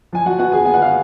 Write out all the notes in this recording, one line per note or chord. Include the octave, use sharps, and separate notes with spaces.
F3 G#5
F#4 F#5
B3 F#4 F#5
G#4 G#5
B3 G#5
F#5
F5